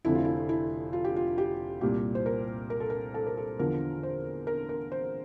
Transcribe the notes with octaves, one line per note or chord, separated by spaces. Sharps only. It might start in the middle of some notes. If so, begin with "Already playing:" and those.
F1 F2 D3 F3 E4
F4
E4
E4
F4
G4
F4
G4
C2 A#2 G3 G4
C5
A#4
A#4
A4
A#4
A4
A#4
A4
E2 D3 F3 A#4
C5
A#4
A#4
C5